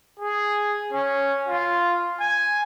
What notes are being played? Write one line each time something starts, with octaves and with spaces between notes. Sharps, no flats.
G#4
C#4
F4
G#5